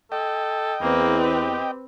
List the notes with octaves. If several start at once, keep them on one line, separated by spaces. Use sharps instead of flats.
A4 D#5 G5
E2 A#3 C4 B4
G4